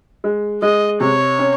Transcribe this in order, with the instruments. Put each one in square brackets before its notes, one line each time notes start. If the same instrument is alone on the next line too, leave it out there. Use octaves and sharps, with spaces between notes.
[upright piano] G#3
[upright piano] G#3 [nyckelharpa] D#5
[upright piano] C3 [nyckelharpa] C#5
[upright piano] C#4